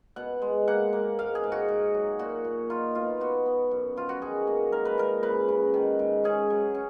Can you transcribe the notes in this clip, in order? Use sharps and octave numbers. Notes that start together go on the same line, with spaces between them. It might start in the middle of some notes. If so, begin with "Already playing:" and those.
B2 F#5
G#3
A#3 F#5
A#3
G#2 F5
G#4
G#2
F#4
G#2
F#3
A#2 F#4
A#2
D#4 F4
B2 F4
B3 F#4
B3
F#2
F3 F4
F#4
D#3 G#4
A#3
G#3 A#4
B4
A#2 A#4
C#3 B4
C#3
D#3
G#2
C#4 G#4
F#3
C#4